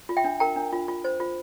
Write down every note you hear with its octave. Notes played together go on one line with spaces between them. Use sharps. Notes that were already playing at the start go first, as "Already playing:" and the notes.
F4
E5 G5
D4
A#4 G5 A#5
D4
F4
F4
C5
F4